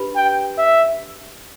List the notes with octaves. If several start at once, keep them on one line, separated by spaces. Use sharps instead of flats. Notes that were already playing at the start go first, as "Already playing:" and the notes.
Already playing: D4 G4 B4 B5
G5
E5